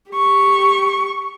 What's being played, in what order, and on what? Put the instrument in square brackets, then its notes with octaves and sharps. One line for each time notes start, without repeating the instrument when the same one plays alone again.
[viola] G4 C#6